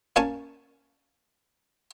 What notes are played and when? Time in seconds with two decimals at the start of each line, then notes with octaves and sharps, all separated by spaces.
0.16 A#3 C#4 G#5 A5 C#6